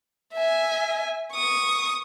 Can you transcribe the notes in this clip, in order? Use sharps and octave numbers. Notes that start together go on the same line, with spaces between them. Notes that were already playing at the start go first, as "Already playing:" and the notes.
E5 G#5
C#6 D#6